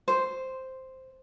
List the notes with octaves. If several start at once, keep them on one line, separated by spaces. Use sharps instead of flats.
C5